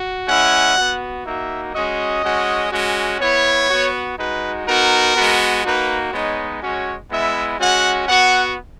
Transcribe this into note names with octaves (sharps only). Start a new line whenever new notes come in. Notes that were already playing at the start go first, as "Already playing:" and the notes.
Already playing: F#4
G#3 C#4 E4 F#5
B3 F#4
A#3 D#4 F#4 E5
G#3 C#4 F#4 D#5
G#3 C#4 F#4
G#3 C#4 F#4
B3 E4 C#5
B3 F#4
G#3 D#4 F#4 B4
B3 D#4 F#4 A#4
G#3 B3 F#4
A#3 D#4 F#4 B4
G#3 B3 D#4 C#5
G#3 C#4 F#4 C#5
G#3 B3 E4 E5
G#3 C#4 F#4 F#5
B3 F#4 F#5